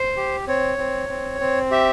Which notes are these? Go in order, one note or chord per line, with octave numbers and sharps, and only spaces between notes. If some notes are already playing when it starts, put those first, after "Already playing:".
Already playing: C5
G4
C4 C#5
C4
C4
C4
G4 E5